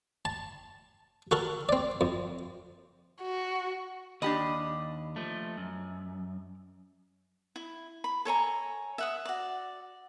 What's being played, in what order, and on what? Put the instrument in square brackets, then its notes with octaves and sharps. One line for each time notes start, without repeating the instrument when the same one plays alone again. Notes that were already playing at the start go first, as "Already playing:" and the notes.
[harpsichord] A5
F#4 A4 A#4
C4 D5
F2
[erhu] F#4
[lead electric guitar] D#2 B5 [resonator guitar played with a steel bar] D4 G4 D#5
[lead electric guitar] F3 A3
F#2
[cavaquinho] E4
B5
A4 C#5 G#5 A#5
E5 F#5 D#6
F#4 D5